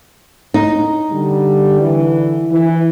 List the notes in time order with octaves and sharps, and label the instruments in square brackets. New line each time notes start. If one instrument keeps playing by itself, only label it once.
[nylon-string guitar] D#4
[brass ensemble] D3 G3
D3 E3
E3